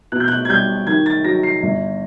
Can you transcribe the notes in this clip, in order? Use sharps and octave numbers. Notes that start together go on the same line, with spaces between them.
B2 F#6
G6
F#6
G#6
G3 G6
D#3 G#6
A6
F#3 A#6
C7
G1